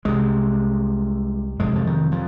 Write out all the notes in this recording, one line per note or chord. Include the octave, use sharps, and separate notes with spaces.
C2 C3 G#3
F2 C3 G#3
F3
D#3
F3